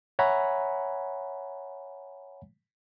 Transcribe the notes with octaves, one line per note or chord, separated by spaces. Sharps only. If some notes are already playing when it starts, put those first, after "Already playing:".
C#5 E5 F#5 G#5 A#5 B5